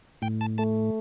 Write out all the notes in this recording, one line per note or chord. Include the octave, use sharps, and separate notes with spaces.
A2 G5
A5
A3 A5